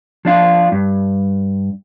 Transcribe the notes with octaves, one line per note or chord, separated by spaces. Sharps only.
F3 D4 F4
G2